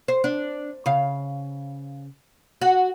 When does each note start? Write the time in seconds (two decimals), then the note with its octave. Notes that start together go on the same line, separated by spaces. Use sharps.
0.08 C5
0.24 D4
0.86 C#3 F5
2.61 F#4